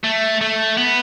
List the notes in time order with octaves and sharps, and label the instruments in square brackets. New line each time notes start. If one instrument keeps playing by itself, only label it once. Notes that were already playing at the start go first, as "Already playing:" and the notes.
[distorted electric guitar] A3
A3
B3